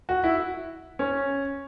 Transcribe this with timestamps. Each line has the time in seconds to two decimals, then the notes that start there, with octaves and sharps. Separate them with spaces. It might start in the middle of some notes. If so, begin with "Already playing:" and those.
0.09 F#4
0.24 E4
0.99 C#4